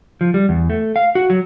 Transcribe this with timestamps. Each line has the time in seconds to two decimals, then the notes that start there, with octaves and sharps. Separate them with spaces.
0.21 F3
0.34 G3
0.49 E2
0.70 A3
0.96 F5
1.15 F#4
1.30 F#3